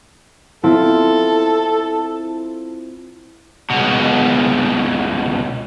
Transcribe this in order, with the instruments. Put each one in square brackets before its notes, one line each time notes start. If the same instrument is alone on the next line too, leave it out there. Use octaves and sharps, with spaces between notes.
[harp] C4 E4 F4 [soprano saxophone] A4
[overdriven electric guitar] C#2 B2